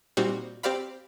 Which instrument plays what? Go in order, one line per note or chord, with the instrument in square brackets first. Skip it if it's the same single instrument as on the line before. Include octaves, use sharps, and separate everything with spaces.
[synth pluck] A#2 G3 C4 D#4 F#4 G4
C4 G4 C5 D5 F5 B5